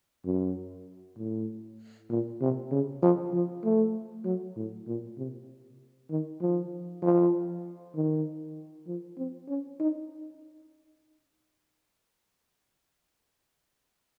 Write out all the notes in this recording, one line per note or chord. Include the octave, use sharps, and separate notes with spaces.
F#2
A2
A#2
C3
C#3
F3
F3
A3
F#3
A2
A#2
C3
D#3
F3
F3
D#3
F3
C4
C#4
D#4